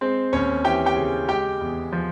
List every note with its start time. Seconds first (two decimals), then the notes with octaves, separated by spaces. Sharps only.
0.01 G#3 C4 C5
0.33 D#2 C#4 C#5
0.65 E3 G4 G5
0.86 G4 G5
0.97 C#3
1.29 G#3 G4 G5
1.61 E2
1.92 F3